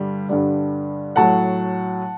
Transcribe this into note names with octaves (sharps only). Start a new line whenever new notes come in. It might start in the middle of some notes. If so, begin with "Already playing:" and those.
Already playing: G2 D3 G3
G2 D3 G3
A2 F#3 F#5 A5